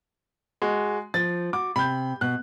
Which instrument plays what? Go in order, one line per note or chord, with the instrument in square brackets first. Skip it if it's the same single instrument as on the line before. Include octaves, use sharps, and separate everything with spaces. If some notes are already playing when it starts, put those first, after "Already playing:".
[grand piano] G#3 F#4
[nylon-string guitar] F3 [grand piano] A6
[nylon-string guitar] F#4 [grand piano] D6
[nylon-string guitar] C3 [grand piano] B5 G6
[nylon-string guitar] B2 [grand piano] F#6